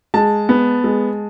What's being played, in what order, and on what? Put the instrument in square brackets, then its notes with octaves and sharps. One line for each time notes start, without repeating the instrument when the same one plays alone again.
[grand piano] G#3 A5
B3
G#3